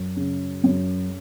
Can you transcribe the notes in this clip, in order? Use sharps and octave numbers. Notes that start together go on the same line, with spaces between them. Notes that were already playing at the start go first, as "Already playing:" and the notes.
Already playing: F#2
C#3
F#2